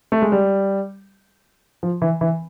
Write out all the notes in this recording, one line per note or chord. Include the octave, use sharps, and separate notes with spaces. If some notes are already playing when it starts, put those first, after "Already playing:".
A3
G#3
G3
F3
E3
E3